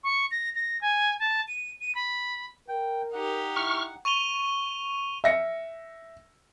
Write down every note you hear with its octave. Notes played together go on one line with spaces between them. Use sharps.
C#6
A#6
A#6
G#5
A5
D#7
D#7
B5
A#4 G5
D#4 G4 F#5
E4 C#6 F6
C#6 D#7 F7 G7
E5 A#6 C#7